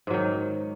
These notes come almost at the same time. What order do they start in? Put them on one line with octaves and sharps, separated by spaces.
G#2 F#3 D#3